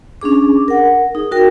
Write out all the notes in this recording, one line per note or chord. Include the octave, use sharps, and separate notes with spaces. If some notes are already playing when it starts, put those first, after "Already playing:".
C#4 D4 G#4 D6
A#4 F#5
D#4 G#4
F#4 A#4 G5